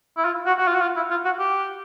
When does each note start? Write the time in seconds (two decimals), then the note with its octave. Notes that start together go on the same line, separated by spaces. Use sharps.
0.17 E4
0.25 F4
0.46 F#4
0.59 F#4
0.68 F4
0.75 F#4
0.81 F4
0.96 E4
1.11 F4
1.25 F#4
1.39 G4